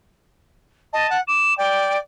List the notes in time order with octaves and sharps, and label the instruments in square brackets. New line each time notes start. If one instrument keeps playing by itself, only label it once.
[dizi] D#5 [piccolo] A5
[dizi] F#5
[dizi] D6 [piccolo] E7
[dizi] D5 [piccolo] G5